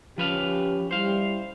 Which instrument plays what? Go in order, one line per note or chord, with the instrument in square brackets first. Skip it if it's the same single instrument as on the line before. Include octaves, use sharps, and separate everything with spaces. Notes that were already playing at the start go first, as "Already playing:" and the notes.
[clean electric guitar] F3 B4 F5 [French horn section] C#4 G4
[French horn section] G3 E4 [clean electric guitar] C5 F5